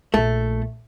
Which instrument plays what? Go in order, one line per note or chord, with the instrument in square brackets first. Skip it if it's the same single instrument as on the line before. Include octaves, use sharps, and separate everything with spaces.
[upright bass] A#1 [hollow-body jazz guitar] A3